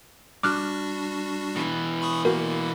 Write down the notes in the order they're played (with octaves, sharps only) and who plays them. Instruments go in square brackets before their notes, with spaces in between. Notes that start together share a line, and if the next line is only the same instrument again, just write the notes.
[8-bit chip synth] G3 D4 F#4 [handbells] D6 F6 F#6
[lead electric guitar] B2 E3
[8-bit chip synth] B5 C#6 D#6
[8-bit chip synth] A#3 [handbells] F#4 A#4